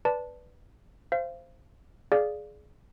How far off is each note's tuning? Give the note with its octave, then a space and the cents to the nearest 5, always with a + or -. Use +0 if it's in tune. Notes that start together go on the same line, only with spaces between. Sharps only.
B4 +0 D5 +0 A5 +0
C5 +0 F5 -30
G#4 +20 D5 +0 F5 +0